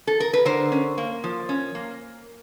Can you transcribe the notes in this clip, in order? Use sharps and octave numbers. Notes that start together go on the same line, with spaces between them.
A4
A#4
B4
D3 A#4 C5
C#4
A#3
F3
C#4
A#3